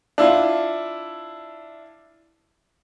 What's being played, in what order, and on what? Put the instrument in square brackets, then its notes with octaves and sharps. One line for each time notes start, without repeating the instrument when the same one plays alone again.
[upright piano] D4 E4 F4